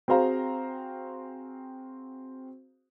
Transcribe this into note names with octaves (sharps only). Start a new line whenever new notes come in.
C4 F#4 G#4 C5 F5 A#5